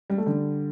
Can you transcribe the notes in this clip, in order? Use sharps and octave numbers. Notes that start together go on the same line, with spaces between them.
G3
A3
D3 G3